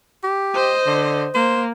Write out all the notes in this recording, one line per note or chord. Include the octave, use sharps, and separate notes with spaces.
G4
C5 D#5
D3
A#3 C5